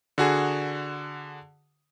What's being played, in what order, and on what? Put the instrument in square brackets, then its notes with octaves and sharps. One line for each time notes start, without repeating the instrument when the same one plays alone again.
[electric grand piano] D3 F#4 G#4